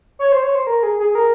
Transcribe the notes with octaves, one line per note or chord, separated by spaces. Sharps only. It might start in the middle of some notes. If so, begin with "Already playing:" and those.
C#5
C5
C#5
C5
A#4
G#4
G#4
A#4